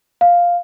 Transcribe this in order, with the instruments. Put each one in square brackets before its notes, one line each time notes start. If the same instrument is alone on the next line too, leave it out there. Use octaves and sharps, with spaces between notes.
[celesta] F5